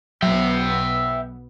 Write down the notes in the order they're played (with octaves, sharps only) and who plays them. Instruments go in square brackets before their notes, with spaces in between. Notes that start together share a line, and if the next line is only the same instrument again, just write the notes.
[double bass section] B1 B2 B3 [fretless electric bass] F#3 [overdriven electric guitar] E5 G5